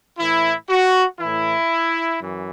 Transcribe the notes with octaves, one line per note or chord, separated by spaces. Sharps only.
A2 E3 E4
F#4
A2 E3 E4
F#2 E3